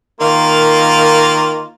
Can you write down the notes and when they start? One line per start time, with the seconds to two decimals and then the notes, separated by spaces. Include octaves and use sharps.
0.21 D#3 A#3 F4 F5